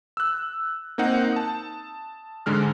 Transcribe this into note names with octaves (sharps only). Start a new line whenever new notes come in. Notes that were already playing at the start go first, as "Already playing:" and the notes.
E6 F#6
A#3 C4 D#4 F#5
A5 D#6
G#2 D3 G#3 F6